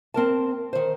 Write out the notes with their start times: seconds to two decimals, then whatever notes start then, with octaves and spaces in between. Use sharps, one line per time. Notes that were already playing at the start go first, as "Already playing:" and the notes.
0.14 C4 A#4 A5
0.73 D#3 C5